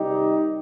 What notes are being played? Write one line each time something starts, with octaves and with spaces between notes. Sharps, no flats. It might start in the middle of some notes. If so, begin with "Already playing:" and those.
Already playing: C3 D#3 G3 D#4 G4